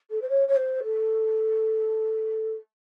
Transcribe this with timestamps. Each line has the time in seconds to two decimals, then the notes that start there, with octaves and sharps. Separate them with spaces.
0.10 A4
0.22 C5
0.29 C#5
0.48 C#5
0.56 C5
0.84 A4